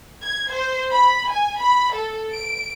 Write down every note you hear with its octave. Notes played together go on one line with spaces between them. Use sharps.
G#6
C5
B5
G#5
B5
A4
D7